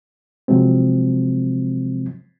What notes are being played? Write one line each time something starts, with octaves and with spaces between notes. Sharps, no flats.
C3 F3 F#3 G#3 C4